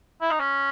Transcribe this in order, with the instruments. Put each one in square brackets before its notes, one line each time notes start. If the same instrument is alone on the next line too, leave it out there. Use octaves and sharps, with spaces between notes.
[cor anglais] E4
D#4
C#4